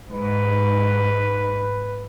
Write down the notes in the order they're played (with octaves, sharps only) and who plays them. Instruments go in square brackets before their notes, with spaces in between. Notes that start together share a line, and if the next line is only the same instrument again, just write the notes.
[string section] G#2 [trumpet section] B4